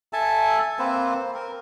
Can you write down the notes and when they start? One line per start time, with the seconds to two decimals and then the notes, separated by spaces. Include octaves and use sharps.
0.13 A4 E5 G#5 A5
0.79 A#3 C4 B4 C5
1.34 A#4